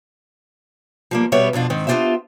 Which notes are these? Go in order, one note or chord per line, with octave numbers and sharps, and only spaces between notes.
F3 G3 A#3
B2 G3 B3 C#5 E5
F2 B2 D4 F4
G#2 D#3 C4
B3 D4 F4 G4 C5 E5